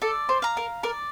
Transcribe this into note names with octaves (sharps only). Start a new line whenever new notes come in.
A4 D5
C5
F5 A#5
A#4
A#4 D5